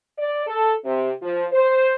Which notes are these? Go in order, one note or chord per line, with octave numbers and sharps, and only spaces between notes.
D5
A4
C3
F3
C5